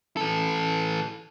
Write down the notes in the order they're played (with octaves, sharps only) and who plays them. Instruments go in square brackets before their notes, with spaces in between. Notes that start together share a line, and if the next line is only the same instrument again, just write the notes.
[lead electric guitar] E3 A4